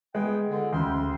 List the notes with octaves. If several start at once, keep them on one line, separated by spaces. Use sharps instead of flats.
G#3 B3 G5
C#2 G2 D3
D2 C#3 G5 C6